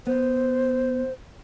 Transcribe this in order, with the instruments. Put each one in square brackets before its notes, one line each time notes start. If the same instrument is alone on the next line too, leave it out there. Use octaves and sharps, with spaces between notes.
[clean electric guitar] B3 [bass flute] C5